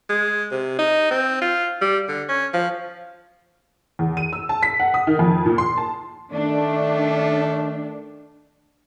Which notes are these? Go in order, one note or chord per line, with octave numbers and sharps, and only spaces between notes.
G#3
C3
D#4
C4
F4
G3
D3
C#4
F3
E2
D#7
E6
A5
B6
F#5
D#6
D#3
F2
A#2
C6
A5
D#3 A3 D4